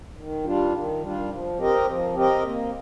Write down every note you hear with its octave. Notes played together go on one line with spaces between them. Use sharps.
D#3
G3 D4 F4
D#3
G3 D4 F4
F3
C4 G4 A#4 D#5
F3
C4 G4 A#4 D#5
A#3